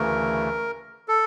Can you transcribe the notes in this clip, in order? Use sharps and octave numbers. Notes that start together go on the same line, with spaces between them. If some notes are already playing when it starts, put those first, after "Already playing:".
Already playing: D2 C#3 E3 A3 A#4
A4